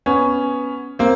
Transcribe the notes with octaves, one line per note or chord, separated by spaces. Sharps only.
B3 C#4
A#3 C4